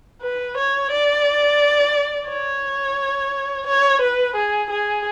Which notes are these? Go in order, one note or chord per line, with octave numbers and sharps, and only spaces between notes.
B4
C#5
D5
C#5
C#5
B4
G#4
G#4